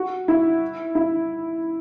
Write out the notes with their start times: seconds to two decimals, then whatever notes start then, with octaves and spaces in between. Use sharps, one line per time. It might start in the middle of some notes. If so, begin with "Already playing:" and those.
Already playing: F#4
0.28 E4
0.95 E4